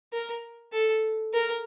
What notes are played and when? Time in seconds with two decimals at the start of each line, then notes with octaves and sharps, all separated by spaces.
0.13 A#4
0.73 A4
1.33 A#4